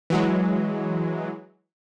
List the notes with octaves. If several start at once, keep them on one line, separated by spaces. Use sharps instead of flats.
E3 F#3 G#3